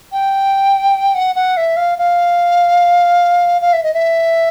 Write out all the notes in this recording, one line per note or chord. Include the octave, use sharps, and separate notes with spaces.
G5
F#5
F#5
E5
F5
F5
F5
E5
D#5
E5